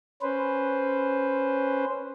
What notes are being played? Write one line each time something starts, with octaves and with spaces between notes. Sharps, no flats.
C#4 B4 C5